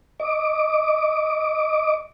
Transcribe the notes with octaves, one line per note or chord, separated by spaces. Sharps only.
D#5 D6